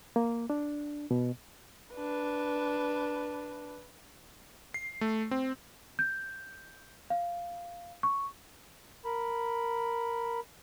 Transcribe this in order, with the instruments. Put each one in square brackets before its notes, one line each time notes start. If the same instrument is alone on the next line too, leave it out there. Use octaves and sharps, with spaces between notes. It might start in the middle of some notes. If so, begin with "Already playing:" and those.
[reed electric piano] A#3
D4
B2
[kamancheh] D4 B4
[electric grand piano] C7
A3
C4
[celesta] G6
F5
C#6
[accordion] A#4 B5